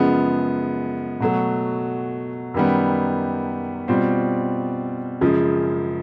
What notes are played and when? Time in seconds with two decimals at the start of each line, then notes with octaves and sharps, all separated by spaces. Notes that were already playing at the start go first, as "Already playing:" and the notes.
Already playing: F#2 C#3 F3 G#3 B3
1.20 B2 F#3 A3
2.54 F#2 D#3 G3 B3
3.88 B2 G3 C4 F4
5.21 F#2 C#3 F3 G#3